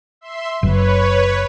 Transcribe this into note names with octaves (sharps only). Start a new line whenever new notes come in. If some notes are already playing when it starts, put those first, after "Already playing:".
E5 C6
F#1 B4 C#5